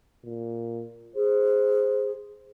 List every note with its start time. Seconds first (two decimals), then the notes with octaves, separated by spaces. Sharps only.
0.24 A#2
1.16 G#4 C5